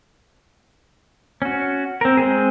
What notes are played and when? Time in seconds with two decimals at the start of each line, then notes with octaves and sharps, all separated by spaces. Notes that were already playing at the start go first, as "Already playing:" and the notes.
1.42 C#4 F#4
2.01 C4 A#4
2.17 G#3 C4 G#4